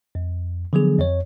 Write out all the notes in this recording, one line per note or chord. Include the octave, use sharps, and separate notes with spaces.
F2
D3 F3 F#3 B3 G#4
F2 C#5